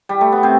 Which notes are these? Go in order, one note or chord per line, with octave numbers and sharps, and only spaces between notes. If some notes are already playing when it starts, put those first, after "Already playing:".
G3
A3
B3
C3 C4